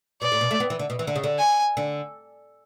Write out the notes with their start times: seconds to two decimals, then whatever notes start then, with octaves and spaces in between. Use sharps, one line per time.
0.22 B2 D5
0.32 A2
0.41 B2
0.51 A3
0.60 B3
0.70 E3
0.79 D3
0.90 B2
0.99 E3
1.07 D3
1.16 C#3
1.24 D3
1.38 G#5
1.77 D3